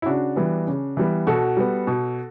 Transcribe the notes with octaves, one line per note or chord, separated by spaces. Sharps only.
E4
C#3 D4 F#4
E3 G3 B3
C#3
E3 G3 B3
B2 F#4 A4
G3 B3
B2